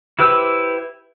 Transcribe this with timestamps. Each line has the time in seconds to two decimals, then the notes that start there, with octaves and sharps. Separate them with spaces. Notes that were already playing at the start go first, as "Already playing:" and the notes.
0.19 E4 G4 B4 C5 E6